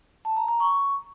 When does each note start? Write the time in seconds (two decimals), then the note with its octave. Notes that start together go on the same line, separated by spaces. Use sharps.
0.25 A5
0.37 A#5
0.48 A#5
0.60 C#6